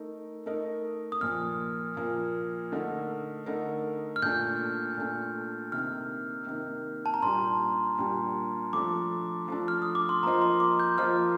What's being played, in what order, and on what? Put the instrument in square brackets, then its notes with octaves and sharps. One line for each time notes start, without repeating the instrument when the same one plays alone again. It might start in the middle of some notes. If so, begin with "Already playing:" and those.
Already playing: [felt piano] A3 D#4 A#4
A3 D#4 A#4 D#5
[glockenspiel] D#6
[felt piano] A#2 F3 A#3 [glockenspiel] F6
[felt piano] A#2 F3 A#3
D3 A3 D#4 A#4
D3 A3 D#4 A#4
[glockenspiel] F6
[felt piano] A#2 A3 D4 [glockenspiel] G6
[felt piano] A#2 A3 D4
[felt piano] C3 D#3 A#3 [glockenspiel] F6
[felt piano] C3 D#3 A#3
[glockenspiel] A5
A#5
[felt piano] A#2 G3 D4 G4 [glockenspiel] C6
[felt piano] A#2 G3 D4 G4
[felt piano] F3 A3 D4 [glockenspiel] D6
[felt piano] F3 A3 D4
[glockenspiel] F6
D#6
D6
C6
[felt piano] F3 A#3 F4 C5 D#5 [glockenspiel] A#5
[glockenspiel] C6
D6
G6
[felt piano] F3 A#3 F4 C5 D#5 [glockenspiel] F6